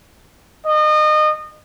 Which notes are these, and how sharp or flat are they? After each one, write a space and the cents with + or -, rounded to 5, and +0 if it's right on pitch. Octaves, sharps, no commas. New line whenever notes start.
D#5 -30